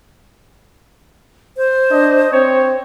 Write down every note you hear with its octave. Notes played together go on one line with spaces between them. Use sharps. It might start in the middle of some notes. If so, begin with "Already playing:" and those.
C5
D4 D#5
C4 C5 C#5